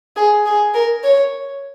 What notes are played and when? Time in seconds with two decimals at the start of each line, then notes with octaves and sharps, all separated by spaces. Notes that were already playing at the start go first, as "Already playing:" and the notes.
0.16 G#4
0.46 G#4
0.74 A#4
1.04 C#5